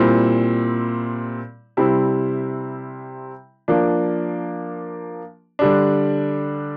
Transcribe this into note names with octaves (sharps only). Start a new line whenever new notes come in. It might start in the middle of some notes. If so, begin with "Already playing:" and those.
Already playing: A#2 G3 C4 E4
C3 G3 C4 E4
F3 A#3 D4
D3 G3 D4